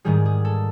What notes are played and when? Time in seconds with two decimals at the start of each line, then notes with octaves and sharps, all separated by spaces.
0.05 G#2 D#3 G3 G#4
0.25 G#4
0.45 A4